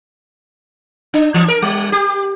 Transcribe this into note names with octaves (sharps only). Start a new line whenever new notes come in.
D4
E3
A#4
G3
G4